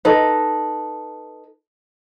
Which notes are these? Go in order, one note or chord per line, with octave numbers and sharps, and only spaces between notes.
D#4 A4 B4